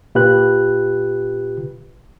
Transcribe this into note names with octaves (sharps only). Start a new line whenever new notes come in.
A#2 F4 G4 B4 F#6